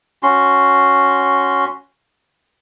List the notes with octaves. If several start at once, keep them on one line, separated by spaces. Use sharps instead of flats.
C#4 F#4 C6